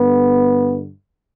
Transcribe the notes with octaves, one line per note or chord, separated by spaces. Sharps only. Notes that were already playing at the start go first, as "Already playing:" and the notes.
Already playing: G2 D3 B3